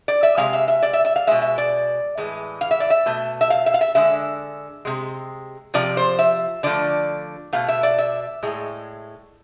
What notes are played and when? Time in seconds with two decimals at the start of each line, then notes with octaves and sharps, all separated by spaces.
0.08 D5
0.23 E5
0.37 C3 G#3 F5
0.53 E5
0.68 E5
0.83 D5
0.93 E5
1.05 E5
1.16 F5
1.27 B2 G#3 E5
1.42 E5
1.58 D5
2.17 A2 E3 G#3
2.61 F5
2.71 E5
2.80 D5
2.90 E5
3.06 B2 A3
3.41 E5
3.50 F5
3.66 E5
3.74 F5
3.81 E5
3.95 D3 G#3 E5
4.85 C3 G#3
5.74 C3 F3 D5
5.97 C5
6.19 E5
6.63 D3 F3 A3 D5
7.53 B2 A3 F5
7.68 E5
7.83 D5
7.98 E5
8.43 A2 G#3